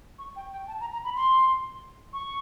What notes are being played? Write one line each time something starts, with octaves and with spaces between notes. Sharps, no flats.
C#6
G5
G5
A5
A#5
A#5
B5
C6
C#6